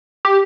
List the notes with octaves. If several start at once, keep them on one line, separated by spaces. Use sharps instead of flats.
G4